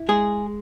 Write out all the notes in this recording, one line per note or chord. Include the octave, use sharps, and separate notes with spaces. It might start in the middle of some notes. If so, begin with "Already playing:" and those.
Already playing: E4
G#3 G#4